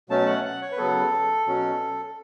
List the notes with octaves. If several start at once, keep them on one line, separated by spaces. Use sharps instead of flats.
B2 F#3 A3 C#4 A5
F#5
F#5
C#5
B4
C#3 F#3 B3 A4
B2 F#3 C#4